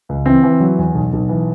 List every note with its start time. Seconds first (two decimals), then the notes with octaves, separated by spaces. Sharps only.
0.09 C#2
0.26 E3 C4
0.44 E3
0.60 F#3
0.79 E2
0.95 B1
1.13 B1
1.29 E3